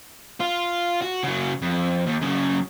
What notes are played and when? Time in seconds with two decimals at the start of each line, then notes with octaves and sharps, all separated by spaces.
0.40 F4
1.02 F#4
1.23 C#3 F#3
1.62 F2
2.07 D#2
2.22 F#2 C#3